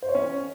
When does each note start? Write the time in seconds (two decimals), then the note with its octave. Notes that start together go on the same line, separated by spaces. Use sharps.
0.02 C5
0.09 C#5
0.15 C#4